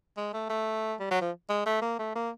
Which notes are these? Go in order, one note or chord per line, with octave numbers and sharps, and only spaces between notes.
G#3
A3
A3
G3
F#3
F3
G#3
A3
A#3
A3
A#3